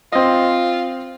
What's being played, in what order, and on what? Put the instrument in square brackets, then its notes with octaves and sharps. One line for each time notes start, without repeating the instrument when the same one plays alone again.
[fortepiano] C4 D#5 [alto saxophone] F4